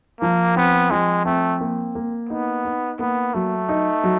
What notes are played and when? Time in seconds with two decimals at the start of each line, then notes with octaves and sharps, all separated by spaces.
0.21 F3 A#3
0.56 B3 C4
0.91 F3 G#3
1.26 A3 C4
1.61 A#3
1.95 A#3
2.29 B3 D#4
2.65 D#4
2.99 A#3 B3
3.34 F#3 A3
3.69 D#4
4.04 F#3